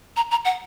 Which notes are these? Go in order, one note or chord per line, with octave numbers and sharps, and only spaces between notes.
A#5
A#5
F#5